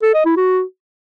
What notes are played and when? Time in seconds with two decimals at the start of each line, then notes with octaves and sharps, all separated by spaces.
0.03 A4
0.14 D#5
0.25 E4
0.37 F#4